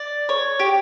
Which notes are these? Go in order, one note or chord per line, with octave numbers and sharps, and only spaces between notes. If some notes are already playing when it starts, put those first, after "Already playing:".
Already playing: D5
C#5
G4